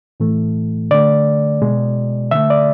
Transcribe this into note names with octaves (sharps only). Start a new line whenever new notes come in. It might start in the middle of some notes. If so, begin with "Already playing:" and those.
A2 E3 A3
D3 A3 D5
B2 G#3
D3 A3 E5
D5